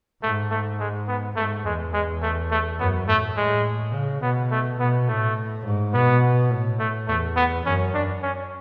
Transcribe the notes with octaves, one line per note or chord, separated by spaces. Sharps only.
G#2 A3
A3
G#3
B3
G#2 A3
E2 G#3
G#3
A3
A3
F#2 B3
A2 A3
A2 G#3
C#3
B2 B3
A3
B2 B3
A2 A3
G#2
B2 B3
A2
A3
E2 A3
B3
F#2 C#4
D4
C#4